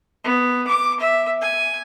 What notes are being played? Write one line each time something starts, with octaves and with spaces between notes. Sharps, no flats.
B3
D6
E5
G#5